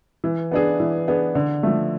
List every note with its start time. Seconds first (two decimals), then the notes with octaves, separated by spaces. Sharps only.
0.24 E3
0.51 B3 D4 G#4
0.80 E3
1.08 B3 D4 G#4
1.35 D3
1.63 F3 A3